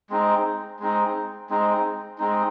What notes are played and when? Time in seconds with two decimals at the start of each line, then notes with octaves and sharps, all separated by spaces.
0.10 G#3 C4 D#4
0.79 G#3 C4 D#4
1.50 G#3 C4 D#4
2.18 G#3 C4 D#4